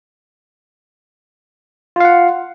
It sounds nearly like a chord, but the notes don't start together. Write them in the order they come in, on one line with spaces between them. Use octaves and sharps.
F4 F5 F#5